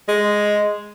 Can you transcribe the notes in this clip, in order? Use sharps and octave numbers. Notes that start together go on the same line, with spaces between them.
G#3